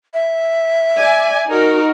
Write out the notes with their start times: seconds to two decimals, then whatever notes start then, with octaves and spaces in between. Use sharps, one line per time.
0.14 E5
0.98 D5 G#5
1.49 D#4 F#4 A#4